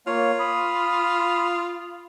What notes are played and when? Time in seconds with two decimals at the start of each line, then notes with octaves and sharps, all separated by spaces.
0.07 A#3 F4 C#5
0.39 B5 D#6